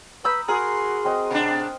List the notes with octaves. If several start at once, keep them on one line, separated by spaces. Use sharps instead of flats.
B4 A#5 B5 D#6 E6 G6
F#4 G#4 A#4 G#5 C6
C4 C5 D#5
B2 D4 C5